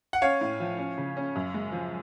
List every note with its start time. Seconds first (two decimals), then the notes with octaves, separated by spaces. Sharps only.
0.13 F#5
0.22 C#4 C#5 F5
0.41 A2
0.60 F3
0.79 C#4
0.98 C#3
1.17 C#4
1.36 F#2
1.54 G#3
1.72 F3